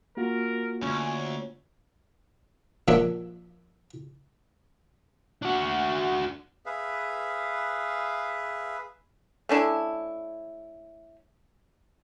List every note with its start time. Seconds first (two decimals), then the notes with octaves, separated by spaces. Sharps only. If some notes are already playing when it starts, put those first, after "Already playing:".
0.17 A#3 F4 F#4 A#4
0.82 D2 G2 C#4 C#5
2.88 A#2 F3 F#3 D4 E5
5.43 D4 F#4
6.66 G#4 B4 E5 F5
9.49 A3 C#4 D4 E4